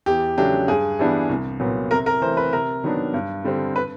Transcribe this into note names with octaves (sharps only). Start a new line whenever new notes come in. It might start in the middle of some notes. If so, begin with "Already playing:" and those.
E2 G4
C#3 F#3 A3 D4 G4
G2 G#4
E3 G3 B3 D4
C2
A#2 F#3 B3
C3 A#4
A#4
E3 A3 C4 C5
B4
C3 A#4
D#3 F#3 B3 D4
G2
D3 G3 C4
B4